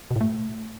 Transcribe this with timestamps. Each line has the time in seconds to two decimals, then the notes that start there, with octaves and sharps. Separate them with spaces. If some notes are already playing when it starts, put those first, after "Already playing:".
0.11 B2
0.16 A2
0.21 A3